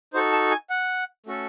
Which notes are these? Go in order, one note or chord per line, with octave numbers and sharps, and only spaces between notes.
D#4 F#4 A4 C5
A5
G#5
F#5
A3 C#4 F#4 A4